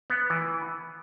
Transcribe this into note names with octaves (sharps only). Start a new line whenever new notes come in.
B3
E3